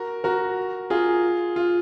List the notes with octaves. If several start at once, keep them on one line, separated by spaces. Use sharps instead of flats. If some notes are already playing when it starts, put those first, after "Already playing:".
Already playing: F#4 A#4
F#4 A#4
F4 G#4
F4